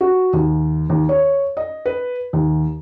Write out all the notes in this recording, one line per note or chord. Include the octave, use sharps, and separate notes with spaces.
F#4
D#2
D#2
C#5
D#5
B4
D#2